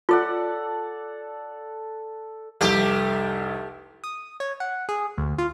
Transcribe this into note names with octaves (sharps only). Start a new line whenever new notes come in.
F4 A4 D5 F#5
F1 C2 A3 G4
D#6
C#5
F#5
G#4
D2
F4